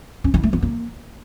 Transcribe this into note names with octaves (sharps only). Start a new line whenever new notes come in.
C#4
E4
A3
B3
A#3